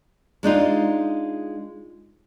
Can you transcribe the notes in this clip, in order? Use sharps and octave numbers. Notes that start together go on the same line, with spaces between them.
G#3 D4 D#4 F4